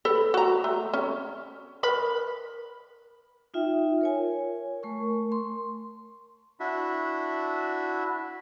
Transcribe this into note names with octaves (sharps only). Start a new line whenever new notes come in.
A4 B4
F#4 A#5
A3
C#4
A#4 B4 B5
D#4 F4 E5 G5
A#4 C#5 G#5
A3 A#4 C#6
C6
D4 E4 F#4 E5